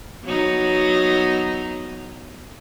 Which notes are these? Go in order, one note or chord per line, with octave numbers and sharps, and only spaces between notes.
F#3 B3 D#4